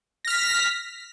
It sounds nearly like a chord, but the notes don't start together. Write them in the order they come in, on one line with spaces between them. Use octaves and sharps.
A#6 F6 B6